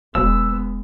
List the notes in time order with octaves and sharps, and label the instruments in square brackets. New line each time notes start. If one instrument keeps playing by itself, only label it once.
[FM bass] E1 [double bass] G#3 B3 [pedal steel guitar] E6